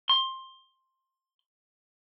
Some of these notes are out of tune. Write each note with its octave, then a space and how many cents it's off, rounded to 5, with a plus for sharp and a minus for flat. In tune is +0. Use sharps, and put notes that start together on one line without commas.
C6 +15